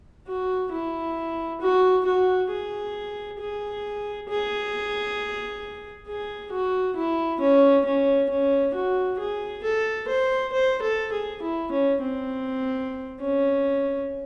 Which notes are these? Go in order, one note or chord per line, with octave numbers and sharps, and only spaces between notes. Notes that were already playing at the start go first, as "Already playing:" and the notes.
F#4
E4
F#4
F#4
G#4
G#4
G#4
G#4
F#4
E4
C#4
C#4
C#4
F#4
G#4
A4
C5
C5
A4
G#4
E4
C#4
C4
C#4